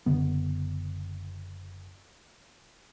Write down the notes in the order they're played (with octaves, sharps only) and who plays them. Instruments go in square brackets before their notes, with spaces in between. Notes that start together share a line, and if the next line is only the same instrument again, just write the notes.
[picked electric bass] F#1 D3 B3